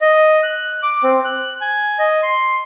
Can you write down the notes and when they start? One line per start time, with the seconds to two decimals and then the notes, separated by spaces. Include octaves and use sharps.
0.01 D#5
0.43 F#6
0.83 D6
1.03 C4
1.25 F#6
1.61 G#5
1.99 D#5
2.23 C6